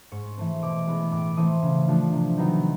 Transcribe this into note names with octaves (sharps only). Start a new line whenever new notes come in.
G#2 C#6
E3 A3 C4
B2 D6
G#3 B3 E4
A2 D6
E3 A3 C4 D#6
C#3
F3 A3 D4 F4
C3
D#3 F#3 B3 D#4